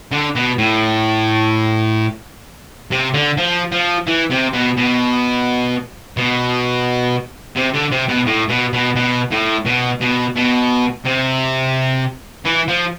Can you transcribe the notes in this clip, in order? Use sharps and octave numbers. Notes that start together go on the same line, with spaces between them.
D3
B2
A2
C3
D3
F3
F3
E3
C3
B2
B2
B2
C3
D3
C3
B2
A2
B2
B2
B2
A2
B2
B2
B2
C3
E3
F3